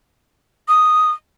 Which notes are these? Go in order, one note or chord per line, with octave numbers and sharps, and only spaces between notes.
D#6